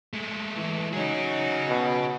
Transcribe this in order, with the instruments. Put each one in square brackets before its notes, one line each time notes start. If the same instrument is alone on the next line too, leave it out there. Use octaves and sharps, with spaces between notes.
[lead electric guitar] G#3 A3
[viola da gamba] E3
[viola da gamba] F#3 D#4 [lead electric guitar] C#4 G#4
[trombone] B2